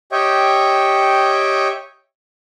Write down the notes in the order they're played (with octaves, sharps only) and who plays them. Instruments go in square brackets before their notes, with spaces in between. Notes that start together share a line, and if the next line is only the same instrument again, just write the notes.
[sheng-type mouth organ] G4 C#5 D#5 E5 G5